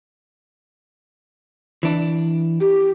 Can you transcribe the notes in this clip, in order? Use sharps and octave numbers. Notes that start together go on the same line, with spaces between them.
E3 D4
G4